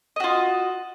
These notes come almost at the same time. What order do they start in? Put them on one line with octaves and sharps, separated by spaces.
D#5 F#4 F4